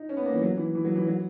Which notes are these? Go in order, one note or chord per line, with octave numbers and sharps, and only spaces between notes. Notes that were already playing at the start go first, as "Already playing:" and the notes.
Already playing: D#4
C#4
B3
A#3
E3
F#3
E3
E3
F#3
E3
F#3